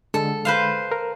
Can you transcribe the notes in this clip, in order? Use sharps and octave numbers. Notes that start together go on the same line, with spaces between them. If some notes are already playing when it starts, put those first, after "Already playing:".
D3 G#3 A4
B4 C5 F5
A#4